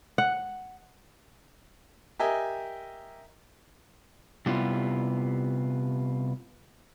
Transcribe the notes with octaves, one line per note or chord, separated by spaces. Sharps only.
F#5
G4 A#4 D#5 E5 G#5
C3 G3 B3 E4 F4